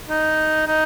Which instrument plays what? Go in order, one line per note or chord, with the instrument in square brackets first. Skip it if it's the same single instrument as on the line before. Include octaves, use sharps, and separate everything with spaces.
[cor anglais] D#4
D#4